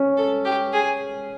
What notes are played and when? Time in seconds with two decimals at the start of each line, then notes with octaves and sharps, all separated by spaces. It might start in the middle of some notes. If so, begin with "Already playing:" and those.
Already playing: C#4
0.17 A4
0.45 G4
0.73 G#4